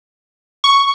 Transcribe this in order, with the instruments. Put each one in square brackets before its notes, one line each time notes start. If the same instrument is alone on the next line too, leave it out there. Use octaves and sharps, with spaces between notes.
[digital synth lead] C#6